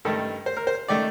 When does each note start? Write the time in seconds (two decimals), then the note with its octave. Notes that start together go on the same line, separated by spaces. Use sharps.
0.05 G2 D#3 A3 A4
0.46 C5
0.57 A#4
0.67 C5
0.88 D#3 A3 D5